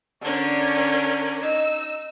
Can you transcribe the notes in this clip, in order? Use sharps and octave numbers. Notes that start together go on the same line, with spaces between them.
D3 C#4 D4 A#4
D#4 E6